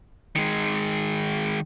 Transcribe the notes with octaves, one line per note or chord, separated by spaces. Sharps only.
D#3 G#3